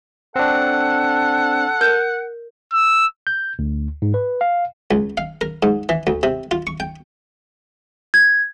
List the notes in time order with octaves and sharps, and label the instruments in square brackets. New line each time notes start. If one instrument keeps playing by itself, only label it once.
[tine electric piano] C4 D4 [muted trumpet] A4 [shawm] F#5
[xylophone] A#4 G6
[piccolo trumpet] E6
[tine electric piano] G6
D2
G#2
B4
F5
[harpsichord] C#2
F5
A#4
G#2
E3
D2
C3
F4
C#6
G5
[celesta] G#6